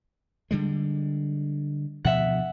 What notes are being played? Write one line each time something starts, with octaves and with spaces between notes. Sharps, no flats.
D3 G3 G#3
D2 B2 F3 E5 F#5